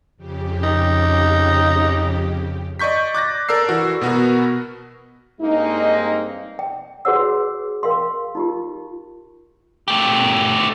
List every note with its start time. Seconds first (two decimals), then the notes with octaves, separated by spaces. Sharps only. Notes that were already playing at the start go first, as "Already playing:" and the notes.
0.17 F2 C#3 G4
0.63 D#4
2.79 D5 D#5 C#6 G6 B6
3.14 D6 F#6 A6 A#6
3.49 A4 A#4 D5 E6 C7
3.69 E3 F#4
4.01 B2 B3 F#4 A#4 B4
5.41 G2 G#3 A#3 C4 D4 D#4
6.59 G5
7.05 F#4 G#4 B4 C#5 F#5 E6
7.83 A#4 F5 G5 C6
8.35 D#4 F4 G4
9.88 A3 G4